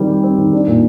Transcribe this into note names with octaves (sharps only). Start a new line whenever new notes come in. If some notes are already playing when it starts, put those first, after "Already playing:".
Already playing: D#3 G3 C4
G4
C4
D#3
D4
A#2